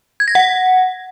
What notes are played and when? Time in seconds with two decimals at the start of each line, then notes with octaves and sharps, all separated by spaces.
0.20 G#6
0.28 A#6
0.35 F#5